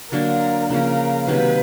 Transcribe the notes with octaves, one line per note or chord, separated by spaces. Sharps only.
D3 F#3 A#3 D4 A#4
C#3 F3 A#3 C#4 A#4
C3 D#3 F#3 A#3 B4